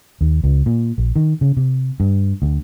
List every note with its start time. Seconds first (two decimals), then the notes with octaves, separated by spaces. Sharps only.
0.21 D#2
0.44 C#2
0.66 A#2
0.98 A#1
1.16 D#3
1.41 C#3
1.57 C3
2.00 G2
2.42 D2